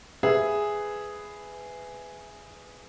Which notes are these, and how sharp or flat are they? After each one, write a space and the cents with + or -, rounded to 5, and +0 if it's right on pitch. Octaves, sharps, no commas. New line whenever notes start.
G#4 +0 B4 +15 E5 +0